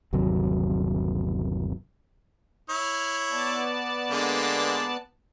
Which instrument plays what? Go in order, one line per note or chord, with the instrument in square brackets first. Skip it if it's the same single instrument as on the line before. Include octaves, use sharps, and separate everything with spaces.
[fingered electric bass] G1 D#2 C3 F#3
[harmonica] E4 C#5 [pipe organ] F6
[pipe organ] B3 D5 A5
[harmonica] D3 G#3 A#3